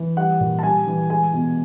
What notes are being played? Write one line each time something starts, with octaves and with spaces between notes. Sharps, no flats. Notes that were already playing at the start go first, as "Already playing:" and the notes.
Already playing: E3
G3 F#5
A#2
A5
G3 G#5
E3
G#3 G#5
B2